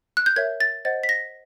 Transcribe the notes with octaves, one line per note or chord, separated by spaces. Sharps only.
F#6
G6
A#4 C#5 E5 G#6
A6
C5 D#5 F#5 A6
B6
A#6